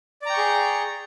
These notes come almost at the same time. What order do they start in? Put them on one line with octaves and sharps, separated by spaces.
D5 A#5 G5 C#6 G#4